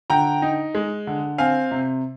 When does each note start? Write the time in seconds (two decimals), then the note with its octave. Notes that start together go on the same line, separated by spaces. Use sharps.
0.10 D3 G5 A#5
0.42 D#4
0.75 G#3
1.07 D3
1.38 C4 F5 G#5
1.71 C3